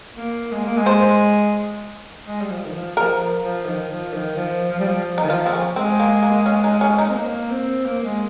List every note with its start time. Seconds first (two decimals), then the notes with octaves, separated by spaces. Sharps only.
0.17 A#3
0.52 G#3
0.64 A#3
0.77 G#3
0.86 C5
2.26 G#3
2.41 G3
2.50 F3
2.65 D#3
2.73 F3
2.96 F3 A#4
3.42 F3
3.66 D#3
3.90 F3
4.13 D#3
4.36 F3
4.71 F3
4.79 G3
4.88 F3
5.18 D#4
5.24 D#3
5.30 F3 F4
5.46 C4
5.53 C#4
5.76 G#3 C4
6.00 A#3
6.22 A#3
6.46 C#4
6.64 D#4
6.81 C#4
6.98 D#4
7.09 C4
7.16 A#3
7.51 C4
7.86 A#3
8.03 G#3